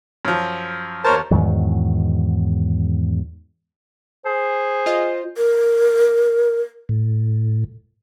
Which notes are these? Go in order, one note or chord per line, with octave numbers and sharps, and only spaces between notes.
F#2 F3
D#2 A#4 C5 C#5 A5
E2 G#2 D#3 F#3
G#4 C5
F4 D#5
A#4
A2